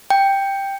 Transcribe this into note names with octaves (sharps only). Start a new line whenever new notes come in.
G5